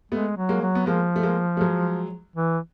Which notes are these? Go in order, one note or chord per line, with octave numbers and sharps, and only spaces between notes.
G#3 A3 B3
F#3
G#3 A#3
F#3
B3
F3 G#3 A#3
A3
G#3 A#3
A3
F#3 G#3
E3